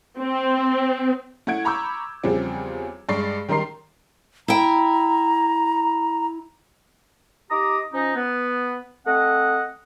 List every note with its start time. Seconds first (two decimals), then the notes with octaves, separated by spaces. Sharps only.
0.18 C4
1.47 A3 E4 F#5 G#6 D7
1.65 A#5 B5 C#6 D6 E6 G6
2.24 E2 C#3 F3 G3 C4
3.09 G2 G#3 D5 C#6 C7
3.48 D#3 G3 D#4 A#4 C6 C7
4.48 E4 G5 A#5
7.50 D#4 G4 A#5 D6 D#6
7.93 F3 C#4 D#4
8.15 B3
9.07 A3 C4 D#5 F#5